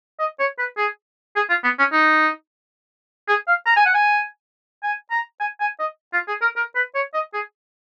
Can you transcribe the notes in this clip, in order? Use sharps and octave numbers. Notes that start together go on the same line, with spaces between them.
D#5
C#5
B4
G#4
G#4
F4
B3
C#4
D#4
G#4
F5
A#5
G#5
F#5
G#5
G#5
A#5
G#5
G#5
D#5
F4
G#4
A#4
A#4
B4
C#5
D#5
G#4